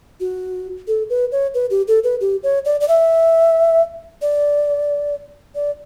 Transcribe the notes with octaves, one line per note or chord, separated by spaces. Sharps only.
F#4
A4
B4
C#5
B4
G4
A4
B4
G4
C#5
D5
D5
E5
D5
D5